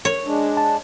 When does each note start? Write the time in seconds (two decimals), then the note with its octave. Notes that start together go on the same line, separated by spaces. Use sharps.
0.05 C#5
0.25 G#3 D4
0.57 A5